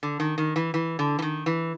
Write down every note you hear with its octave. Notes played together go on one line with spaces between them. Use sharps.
D3
D#3
D#3
E3
E3
D3
E3
D#3
E3